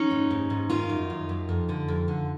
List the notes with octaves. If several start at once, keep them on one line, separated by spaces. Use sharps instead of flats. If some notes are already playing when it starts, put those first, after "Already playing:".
Already playing: C#4 D#4
G#2
G#2
G#2
D#3 D#4 F4
F#2
F#2
F#2
F2
D3
F2
D3